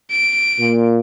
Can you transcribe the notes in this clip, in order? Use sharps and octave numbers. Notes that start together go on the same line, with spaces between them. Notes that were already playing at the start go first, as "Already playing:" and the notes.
D7
A#2